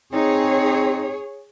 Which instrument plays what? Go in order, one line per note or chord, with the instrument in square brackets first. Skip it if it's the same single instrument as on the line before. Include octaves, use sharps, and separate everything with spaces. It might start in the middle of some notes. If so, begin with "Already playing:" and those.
[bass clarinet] C4 [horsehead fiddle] D#4 [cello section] G#4 C#5